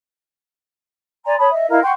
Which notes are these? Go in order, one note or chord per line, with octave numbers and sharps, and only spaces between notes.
D5 G#5 A#5 C6
C#5 A5 B5 D#6
D#5 E5
E4 A#4 D#5 F5
F#5 G5 C6 C#6